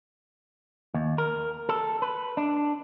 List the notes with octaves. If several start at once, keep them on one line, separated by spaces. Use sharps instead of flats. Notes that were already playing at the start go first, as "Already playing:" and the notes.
D#2
A#4
A4
B4
D4